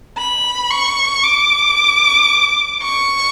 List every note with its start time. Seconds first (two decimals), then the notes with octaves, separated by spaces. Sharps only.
0.18 B5
0.71 C#6
1.23 D6
2.82 C#6